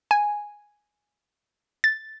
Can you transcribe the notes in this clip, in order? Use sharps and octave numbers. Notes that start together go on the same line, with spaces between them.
G#5
A6